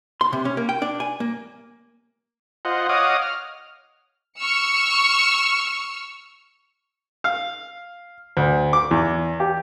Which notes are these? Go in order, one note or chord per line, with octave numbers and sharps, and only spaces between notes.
C6
C3
C#4
A#3
G5
D4
G#5
A#3
F4 C5 D#5 F#5
C#5 D#5 F5 F#5 D6 D#6
F6
C#6 E6 F6 C#7
F5
D2
D6
E2
G4